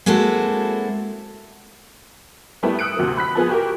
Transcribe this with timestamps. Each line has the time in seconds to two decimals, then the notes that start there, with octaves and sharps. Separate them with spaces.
0.06 G#3 A#3 C4 E4 F#4 A4
2.63 G3 A3 B3 E4
2.79 D#6 E6 F#6 C#7 D7
2.97 D2 C3 F#3 A#3
3.17 B5 F#6 B6
3.35 F3 B3 G#4
3.49 F#4 G4 A#4